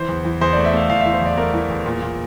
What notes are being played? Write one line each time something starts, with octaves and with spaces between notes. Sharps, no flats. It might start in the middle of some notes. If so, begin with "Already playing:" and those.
Already playing: E3 C5
E2
E3
E2 C5
D5
A3
E5
A3 F5
E2 F5
E5
E3
C5
E2 D5
A3 A#4
E3
E2
A#2
A#2